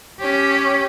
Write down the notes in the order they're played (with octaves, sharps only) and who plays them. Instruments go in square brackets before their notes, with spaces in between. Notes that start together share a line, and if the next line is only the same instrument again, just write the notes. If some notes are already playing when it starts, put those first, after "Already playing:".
[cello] C#4 G4